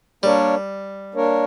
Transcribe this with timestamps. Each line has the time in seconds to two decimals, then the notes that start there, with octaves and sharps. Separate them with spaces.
0.23 G3 A#3 D4 A#4 C#5
1.14 A#3 D4 A#4 C#5